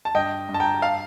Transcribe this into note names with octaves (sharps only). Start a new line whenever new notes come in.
A5
G2 D#5 G5
G2
A5
G5 A#5
F5 A5